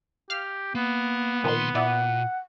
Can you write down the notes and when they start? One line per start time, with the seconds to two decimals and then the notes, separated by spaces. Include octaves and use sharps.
0.30 G4 F5 F6
0.75 A#3 B3
1.44 B1 A#2 D#3 F3 C6
1.75 A#2 E4 D5 F#5